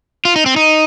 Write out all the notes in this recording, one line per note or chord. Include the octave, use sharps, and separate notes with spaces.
F4
D#4
C4
D#4